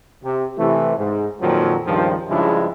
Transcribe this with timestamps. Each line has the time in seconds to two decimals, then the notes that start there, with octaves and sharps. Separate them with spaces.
0.24 C3
0.58 C3 E3 A3
0.97 G#2
1.42 F2 A#2 D#3 F3 F#3
1.87 C#2 G2 D#3 F3
2.29 G2 C#3 F3 G#3 D4 E4